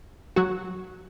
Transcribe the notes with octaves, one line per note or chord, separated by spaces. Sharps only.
F#3 F#4